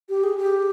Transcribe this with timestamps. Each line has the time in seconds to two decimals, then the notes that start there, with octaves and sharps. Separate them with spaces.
0.09 G4
0.24 G#4
0.37 G4